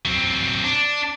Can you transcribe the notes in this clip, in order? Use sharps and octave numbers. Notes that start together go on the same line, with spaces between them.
F#3 C4
D4